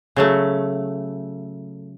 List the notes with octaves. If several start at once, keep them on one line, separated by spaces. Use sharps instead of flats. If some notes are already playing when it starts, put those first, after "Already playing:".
C#3 F#3 A3